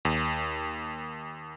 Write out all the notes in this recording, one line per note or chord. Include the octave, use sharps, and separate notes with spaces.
D#2